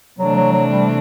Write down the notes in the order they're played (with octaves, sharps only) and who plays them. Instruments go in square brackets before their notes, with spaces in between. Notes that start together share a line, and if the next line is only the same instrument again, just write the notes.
[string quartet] C3 E3 A3 D4 [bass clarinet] F#3
[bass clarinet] F#3
F#3
G3